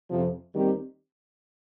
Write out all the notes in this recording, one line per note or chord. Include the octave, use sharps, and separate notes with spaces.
F2 C3 F3
D#2 D#3 G3 C4 G4